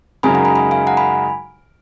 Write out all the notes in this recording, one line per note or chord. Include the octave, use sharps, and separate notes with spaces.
F#2 C#3 G#3 D#4 A#4 G#5 B5
F#5 A#5
G#5 B5
G#5 B5
F5 G#5
F#5 A#5
G#5 B5